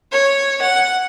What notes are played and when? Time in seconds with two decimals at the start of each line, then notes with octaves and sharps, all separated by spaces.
0.12 C#5
0.62 F#5